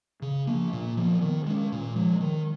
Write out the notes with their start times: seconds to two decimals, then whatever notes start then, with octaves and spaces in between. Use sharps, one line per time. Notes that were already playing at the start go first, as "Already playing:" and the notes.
0.22 C#3
0.47 F3 A#3
0.73 A#2
0.97 F3 B3
1.21 D#3
1.46 G#3 C#4
1.72 A#2
1.96 F3 G#3
2.21 D#3